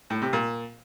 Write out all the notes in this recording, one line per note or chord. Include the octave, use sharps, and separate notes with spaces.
A2
C3
A#2